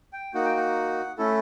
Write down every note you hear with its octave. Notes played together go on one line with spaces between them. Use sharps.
G5
A#3 D#4 F#4 F#5
G5
F#5
A3 C#4 E4 A4